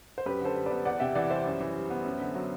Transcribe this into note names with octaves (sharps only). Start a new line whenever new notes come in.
C5
F#2 G4 B4
D3 A4 C5
G3
B3 B4 D5
E2 D5 F#5
C3 E5 G5
E3 D5 F#5
G3 C5 E5
F#2
E3
G3
B3
F#2
D3
F#3